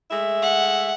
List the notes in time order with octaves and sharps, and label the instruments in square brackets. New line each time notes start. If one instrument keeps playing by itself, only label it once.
[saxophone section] G#3 A3 E5
[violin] F#5